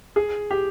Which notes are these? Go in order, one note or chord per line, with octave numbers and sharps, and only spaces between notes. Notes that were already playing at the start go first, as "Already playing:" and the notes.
G#4
G4